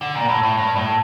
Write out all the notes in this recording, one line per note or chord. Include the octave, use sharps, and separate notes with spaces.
D3
A#2
A2
A2
G2
A2